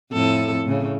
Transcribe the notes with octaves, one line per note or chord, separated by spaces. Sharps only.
F2 A2 A4
A2 C#3